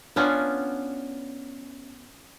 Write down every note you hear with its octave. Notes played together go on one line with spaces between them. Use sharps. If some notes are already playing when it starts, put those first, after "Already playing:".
B3 C#4 D4 F4